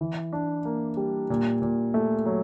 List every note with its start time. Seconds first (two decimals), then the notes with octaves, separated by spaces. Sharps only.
0.01 E3
0.33 D4
0.65 A#3
0.97 G3
1.30 A#2
1.62 A#2
1.94 A3
2.26 F#3